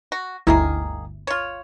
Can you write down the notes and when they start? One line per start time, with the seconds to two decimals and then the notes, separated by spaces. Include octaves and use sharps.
0.12 F#4
0.47 G1 D2 D#3 A#3 E4 G#4
1.27 F4 C#5